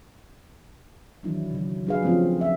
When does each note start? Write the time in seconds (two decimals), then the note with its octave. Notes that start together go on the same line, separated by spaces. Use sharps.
1.23 D#3 E3 F#3 D4 E4
1.51 C#3 F#3
1.87 F#3 D4 G#4 B4 F5
2.03 F3 A3 C4 C#4 F4
2.41 E5